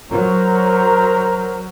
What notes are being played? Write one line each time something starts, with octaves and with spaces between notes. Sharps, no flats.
F#3 A#4 C5 A#5